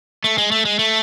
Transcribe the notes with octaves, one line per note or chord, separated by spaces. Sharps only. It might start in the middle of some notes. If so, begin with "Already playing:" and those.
A3
G#3
A3
G#3
A3